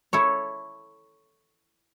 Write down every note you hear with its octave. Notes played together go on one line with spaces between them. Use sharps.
E4 A4 C#5